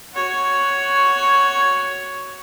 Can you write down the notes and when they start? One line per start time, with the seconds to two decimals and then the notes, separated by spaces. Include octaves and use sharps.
0.14 F#4 C#5